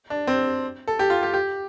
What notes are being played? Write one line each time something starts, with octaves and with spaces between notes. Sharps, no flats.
D4
C4
A4
G4
F4
G4
G4